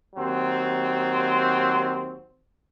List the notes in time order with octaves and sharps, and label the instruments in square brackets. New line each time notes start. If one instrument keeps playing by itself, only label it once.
[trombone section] D#2 F#3 C4